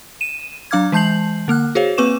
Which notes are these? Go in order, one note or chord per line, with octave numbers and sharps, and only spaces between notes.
D#7 E7
F#3 D4 F5 D6 F6 G#6
E3 G#3 A5 G6 C7 F#7
D3 A#3 F6 F#6
F#4 G#4 C5 C#5 F5
A#3 C4 B4 C#6 D6 E7